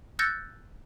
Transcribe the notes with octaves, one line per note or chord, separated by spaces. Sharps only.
E6 F#6 G6 A6 A#6 C#7